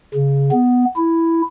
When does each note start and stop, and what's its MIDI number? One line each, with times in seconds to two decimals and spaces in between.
0.15 0.51 49
0.52 0.85 59
0.96 1.41 64